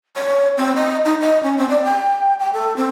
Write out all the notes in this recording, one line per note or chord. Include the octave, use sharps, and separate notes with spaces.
C#5
C4
D#5
D#4
D#5
C#4
C4
D5
G5
G5
A4
C4